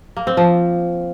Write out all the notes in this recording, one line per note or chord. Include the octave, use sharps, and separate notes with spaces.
A#3
C4
F3